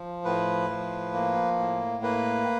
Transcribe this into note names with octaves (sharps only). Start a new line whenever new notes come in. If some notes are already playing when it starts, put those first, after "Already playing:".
Already playing: F3
A2 B4
F3
A#3
A2
A#3 B4